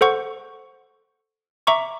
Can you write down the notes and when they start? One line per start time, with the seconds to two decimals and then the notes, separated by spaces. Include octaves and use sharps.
0.01 A4 C5 F#5 C#6
1.67 E5 A#5 C#6 D6